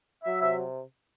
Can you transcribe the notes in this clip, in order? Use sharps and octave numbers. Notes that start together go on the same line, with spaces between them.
F#3 E5
C3 E5